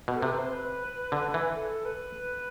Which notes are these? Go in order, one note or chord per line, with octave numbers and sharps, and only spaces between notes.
B2
A4
C3 B4
B4
C5
B4
D3
E3
A4
A4
B4